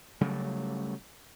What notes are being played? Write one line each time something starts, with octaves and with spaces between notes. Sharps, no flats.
C#3 F#3 G3 A3